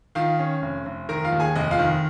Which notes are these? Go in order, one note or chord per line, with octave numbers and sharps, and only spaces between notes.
D#3 F4 F5
C#4
F1
F1
D#3 A#4 A#5
F4 F5
D#2
G#4 G#5
F1 D#5
F4 F5
D#3